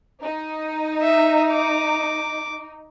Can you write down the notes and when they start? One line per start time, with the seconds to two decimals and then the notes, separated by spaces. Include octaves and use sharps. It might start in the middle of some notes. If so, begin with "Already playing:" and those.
0.24 D#4
1.02 E5
1.52 D6